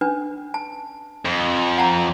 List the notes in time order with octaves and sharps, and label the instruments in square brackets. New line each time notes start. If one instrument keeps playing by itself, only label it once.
[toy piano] C#4 D4 B4
A5
[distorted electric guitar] F2
[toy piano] F#5 A5 A#5